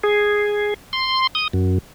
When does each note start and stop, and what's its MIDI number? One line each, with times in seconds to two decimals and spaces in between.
0.04 0.74 68
0.93 1.27 84
1.35 1.48 87
1.53 1.78 42